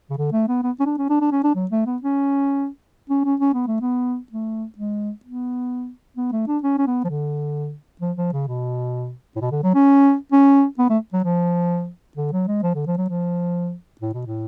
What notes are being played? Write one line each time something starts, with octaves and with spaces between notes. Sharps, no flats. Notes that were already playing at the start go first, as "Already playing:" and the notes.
C#3
D3
A3
B3
B3
C#4
D4
C#4
D4
D4
C#4
D4
F#3
A3
B3
C#4
C#4
C#4
C#4
B3
A3
B3
A3
G#3
B3
B3
A3
D4
C#4
C#4
B3
F3
D3
F3
F3
C#3
B2
A2
B2
D3
F#3
C#4
C#4
B3
A3
F#3
F3
D3
F#3
G#3
F3
D3
F3
F#3
F3
A2
B2
A2